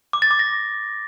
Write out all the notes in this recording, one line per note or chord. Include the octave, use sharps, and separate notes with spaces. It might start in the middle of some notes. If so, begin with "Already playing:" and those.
D6
A6
D6
A#6